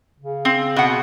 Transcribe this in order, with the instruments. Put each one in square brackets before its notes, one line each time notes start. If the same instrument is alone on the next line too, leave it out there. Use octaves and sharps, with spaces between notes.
[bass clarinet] C#3
[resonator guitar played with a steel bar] C4
B2 F#5